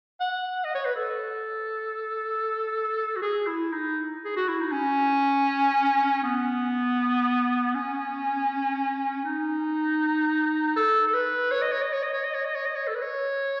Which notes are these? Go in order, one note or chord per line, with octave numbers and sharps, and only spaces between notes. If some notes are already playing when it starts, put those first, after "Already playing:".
F#5
D#5
C#5
B4
A4
F#4
G#4
E4
D#4
G#4
F#4
E4
D#4
C#4
B3
C#4
D#4
A4
A4
B4
C#5
D#5
C#5
D#5
C#5
D#5
C#5
D#5
C#5
D#5
C#5
D#5
C#5
A4
B4
C#5